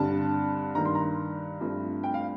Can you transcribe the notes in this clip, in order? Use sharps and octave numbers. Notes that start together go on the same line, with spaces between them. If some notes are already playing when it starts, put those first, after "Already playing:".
Already playing: G2 D3 G3 C4 A5
G2 D#3 A#3 A#5
C6
A#5
G2 F3 A3 C4
G5
F5